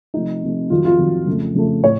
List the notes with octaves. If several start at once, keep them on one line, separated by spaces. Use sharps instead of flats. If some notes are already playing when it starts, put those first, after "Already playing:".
C3 F3 A3 D#4
C3 F3 A3
F2 D#3 F#3 F4
F4
F2 D#3 F#3
F2 C#3 F3 A3
F2 C#3 F3 A3
A2 C#5